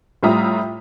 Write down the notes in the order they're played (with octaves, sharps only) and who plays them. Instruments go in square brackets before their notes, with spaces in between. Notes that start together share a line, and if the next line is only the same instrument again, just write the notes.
[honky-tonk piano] A2 G3 F4 E5 A#5 D#6